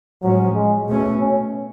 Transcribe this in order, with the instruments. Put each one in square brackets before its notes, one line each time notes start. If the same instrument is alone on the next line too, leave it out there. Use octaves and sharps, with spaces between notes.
[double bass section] A2 F3 G#3 C#4 [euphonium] F#3
[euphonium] G#3
[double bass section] B2 A3 C#4
[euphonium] C#4